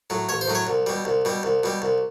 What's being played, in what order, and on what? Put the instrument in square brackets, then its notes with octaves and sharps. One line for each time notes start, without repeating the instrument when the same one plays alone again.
[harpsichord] A2 F#3
A1 C#5
C5
A2 F#3
C#5
C2
B2 G3
C2
B2 G3
C2
B2 G3
C2